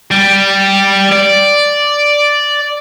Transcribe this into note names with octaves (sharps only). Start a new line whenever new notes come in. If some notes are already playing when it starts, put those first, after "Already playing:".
G3
D5